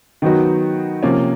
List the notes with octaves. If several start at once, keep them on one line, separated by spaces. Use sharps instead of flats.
D#3 F#3 B3 D#4 F#4
C3 F3 A#3 C#4